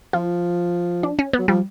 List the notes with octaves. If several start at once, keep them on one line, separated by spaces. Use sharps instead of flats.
F3 F4
D4
C#4
B3
F#3
F3 G3